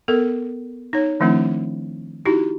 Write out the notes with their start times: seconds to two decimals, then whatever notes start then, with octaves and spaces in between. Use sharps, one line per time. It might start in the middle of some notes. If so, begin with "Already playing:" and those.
0.08 B3 A4 A#4
0.93 D#4 C#5
1.20 D#3 F3 A3 C4 D4 E4
2.25 D#4 E4 F#4 G4